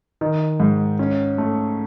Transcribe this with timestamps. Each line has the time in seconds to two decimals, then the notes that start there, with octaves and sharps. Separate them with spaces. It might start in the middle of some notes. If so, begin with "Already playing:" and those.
0.21 D#3
0.60 G#2
0.99 C#4
1.38 A3